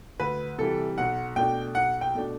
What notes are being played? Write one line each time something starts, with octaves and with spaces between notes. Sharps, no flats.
D2 B4
C3 E3 G3 A4
B1 F#5
B2 A3 D4 G5
B1 F#5
G5
B2 A3 D4